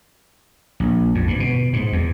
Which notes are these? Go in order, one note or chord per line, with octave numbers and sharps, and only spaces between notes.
A#1
F2
G2
B2
G#2
E2